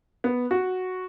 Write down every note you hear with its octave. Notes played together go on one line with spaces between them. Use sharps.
B3
F#4